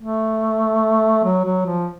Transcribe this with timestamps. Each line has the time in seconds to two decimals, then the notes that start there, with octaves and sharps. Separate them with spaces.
0.01 A3
1.24 F#3
1.45 F#3
1.65 F3